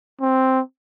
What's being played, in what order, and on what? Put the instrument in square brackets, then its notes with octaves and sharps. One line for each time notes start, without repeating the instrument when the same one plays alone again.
[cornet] C4